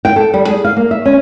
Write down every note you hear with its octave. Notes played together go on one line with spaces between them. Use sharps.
G5
A4
G3
G#4
F5
A#3
E5
C#4